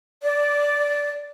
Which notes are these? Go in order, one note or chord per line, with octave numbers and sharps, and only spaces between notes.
D5